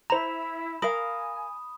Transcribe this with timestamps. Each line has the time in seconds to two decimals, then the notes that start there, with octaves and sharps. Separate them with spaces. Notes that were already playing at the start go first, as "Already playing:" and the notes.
0.10 E4 C5 A#5 B5 E7
0.82 A#4 F5 G#5 B5 D#6